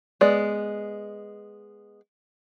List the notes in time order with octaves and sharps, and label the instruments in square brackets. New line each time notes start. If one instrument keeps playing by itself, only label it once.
[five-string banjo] G#3 B3 D5